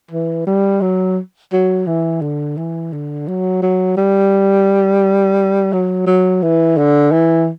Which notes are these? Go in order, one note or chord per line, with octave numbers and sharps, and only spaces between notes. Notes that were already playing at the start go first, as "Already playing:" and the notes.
E3
G3
F#3
F#3
E3
D3
E3
D3
F#3
F#3
G3
F#3
F#3
E3
D3
E3